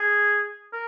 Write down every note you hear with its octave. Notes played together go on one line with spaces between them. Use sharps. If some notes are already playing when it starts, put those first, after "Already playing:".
Already playing: G#4
A#4